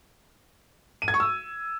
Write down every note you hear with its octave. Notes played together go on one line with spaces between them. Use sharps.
D#7
G#6
C#6
E6